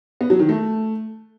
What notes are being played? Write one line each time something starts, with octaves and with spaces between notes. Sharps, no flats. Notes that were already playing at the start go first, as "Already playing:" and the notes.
B3
F#3
D#3
A3